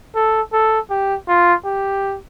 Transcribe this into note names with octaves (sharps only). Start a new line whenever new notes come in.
A4
A4
G4
F4
G4